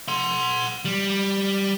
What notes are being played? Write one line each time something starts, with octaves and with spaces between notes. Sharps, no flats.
F#5 C6
G3